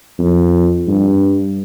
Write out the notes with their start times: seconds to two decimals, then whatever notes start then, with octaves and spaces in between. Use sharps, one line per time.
0.19 F2
0.87 G2